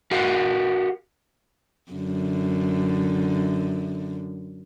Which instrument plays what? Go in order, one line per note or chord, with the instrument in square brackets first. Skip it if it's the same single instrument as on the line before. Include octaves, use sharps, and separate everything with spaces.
[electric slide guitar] F#4 G4 A#4 F5 F#5
[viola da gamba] F#2 D3